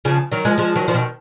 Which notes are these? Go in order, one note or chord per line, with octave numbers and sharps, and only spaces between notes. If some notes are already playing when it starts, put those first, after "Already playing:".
C#3 F3
D#3 F#3
F3 G#3
F3 G#3
D#3 F#3
F3
B2 D#3